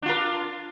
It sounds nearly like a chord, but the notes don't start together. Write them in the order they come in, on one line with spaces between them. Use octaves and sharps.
D4 F4 A#4